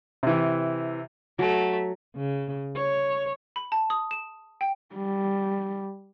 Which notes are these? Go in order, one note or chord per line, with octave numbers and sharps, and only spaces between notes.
C3 E3
F#3 A3
C#3
C#5
B5
A5
D#6
E7
G5
G3